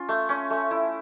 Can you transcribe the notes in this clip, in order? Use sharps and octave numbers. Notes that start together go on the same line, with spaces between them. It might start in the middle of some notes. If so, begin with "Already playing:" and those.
Already playing: C#4 F4
A3
C#4
A3
E4